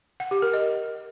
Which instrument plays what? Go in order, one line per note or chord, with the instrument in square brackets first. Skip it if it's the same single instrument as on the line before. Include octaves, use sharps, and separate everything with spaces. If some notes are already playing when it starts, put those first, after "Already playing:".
[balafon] F#5
G4
A#4
D#5